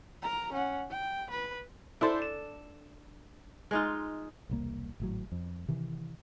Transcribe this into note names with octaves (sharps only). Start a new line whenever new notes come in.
A#4 A#5
C#4 F#5
G5
B4
D4 E4 A4 C5
E7
G#3 D#4 F4
E1 C2 A#3
G#1 A2 F#3
F2
C3 D#3 E3